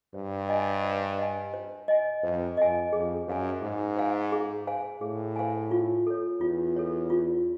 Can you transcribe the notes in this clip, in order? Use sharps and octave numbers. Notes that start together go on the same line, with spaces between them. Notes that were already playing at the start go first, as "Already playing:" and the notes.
G2 C5
D#5 G#5
C5
D#5 G#5
C5
D#5 G#5
F2 C5
F2 D#5 G#5
F2 G#4
F#2 C5 F5 G#5
G#2 G#4
C5 F5 G#5
G#4
C5 F5 G#5
A2 G#4
C5 F5 G#5
F4
A4 C#5
E2 F4
A4 C#5
F4